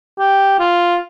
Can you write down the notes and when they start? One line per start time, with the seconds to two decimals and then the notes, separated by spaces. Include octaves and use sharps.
0.19 G4
0.59 F4